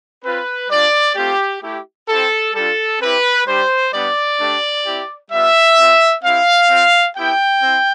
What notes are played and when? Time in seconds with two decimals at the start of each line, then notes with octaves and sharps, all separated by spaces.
0.24 C4 F4 B4
0.70 G3 D4 F4 D5
1.16 A3 C4 F4 G4
1.62 A3 E4 G4
2.09 C4 E4 G4 A4
2.55 G3 D4 F4 A4
3.01 C4 E4 G4 B4
3.47 G3 D4 G4 C5
3.93 G3 B3 D4 D5
4.39 A3 D4 G4
4.85 C4 E4 G4
5.31 G3 B3 F4 E5
5.78 C4 F4
6.24 C4 E4 G4 F5
6.70 C4 F4
7.16 B3 E4 G4 G5
7.63 C4 E4